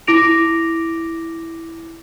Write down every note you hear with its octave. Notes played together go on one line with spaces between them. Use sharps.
E4 D6 A#6 D7 F7